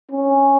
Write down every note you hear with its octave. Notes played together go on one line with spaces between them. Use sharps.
C#4